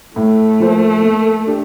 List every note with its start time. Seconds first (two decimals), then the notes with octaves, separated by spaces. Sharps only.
0.16 A2 A3
0.60 F3 A#3 F4 C5
1.03 A#3
1.46 D4 G4